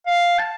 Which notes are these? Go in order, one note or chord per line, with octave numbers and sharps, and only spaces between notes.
F5
A5